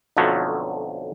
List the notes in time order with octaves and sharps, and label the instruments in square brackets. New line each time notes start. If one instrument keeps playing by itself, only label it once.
[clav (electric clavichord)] B1 F2 D3 F3 F#3 A3